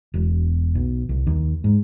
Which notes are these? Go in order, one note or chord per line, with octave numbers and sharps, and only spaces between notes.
E1
B1
C2
D#2
G#2